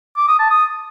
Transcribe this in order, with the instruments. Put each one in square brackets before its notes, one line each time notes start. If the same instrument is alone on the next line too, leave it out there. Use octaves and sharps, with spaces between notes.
[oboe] D6
D#6
A5
D#6